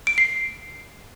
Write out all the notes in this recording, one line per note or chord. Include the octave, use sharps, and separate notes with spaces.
D7
C7